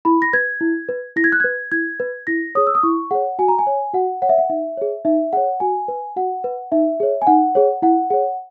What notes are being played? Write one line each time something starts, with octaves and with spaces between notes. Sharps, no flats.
E4 B5
A#6
B4 G#6
E4
B4
E4 A#6
G#6
F#6
B4 G#6
E4 G#6
B4
E4 A#6
G#4 C#5 D#6
E6
D#6
E4 C#6
G#4 C#5 F#5
F#4 G#5
A#5
G#5
C#5
F#4 F#5
C#5 F#5
E5
F#5
D#4 E5
G#4 C#5
D#4 E5
G#4 C#5 F#5
F#4 G#5
B4
F#4 F#5
B4
D#4 E5
G#4 C#5
G#5
D#4 F#5
G#4 C#5
E4 F#5
G#4 C#5 F#5